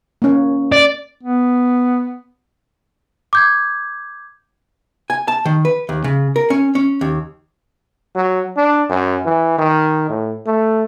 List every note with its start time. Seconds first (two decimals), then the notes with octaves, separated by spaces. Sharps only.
0.22 A#3 C#4
0.72 D5
1.23 B3
3.33 D6 G6 G#6
5.10 G#5
5.28 A5
5.45 D#3
5.65 B4
5.89 D#2
6.04 C#3
6.36 A#4
6.50 C#4
6.75 C#4
7.01 D#2
8.15 F#3
8.57 D4
8.89 F#2
9.26 E3
9.58 D#3
10.09 A2
10.46 A3